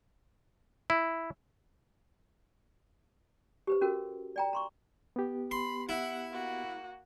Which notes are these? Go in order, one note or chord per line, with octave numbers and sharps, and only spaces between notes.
E4
G4 B4 C5
C#4 F#4 A4 A#4
D5 G5 A#5
A#5 C6 C#6
B3 G4
B5 C6
E4 F#5
A#3 F#4